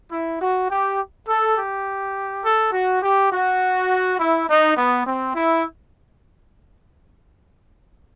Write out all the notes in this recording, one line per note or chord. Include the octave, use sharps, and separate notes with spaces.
E4
F#4
G4
A4
G4
A4
F#4
G4
F#4
E4
D#4
B3
C4
E4